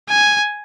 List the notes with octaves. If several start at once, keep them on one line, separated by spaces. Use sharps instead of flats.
G#5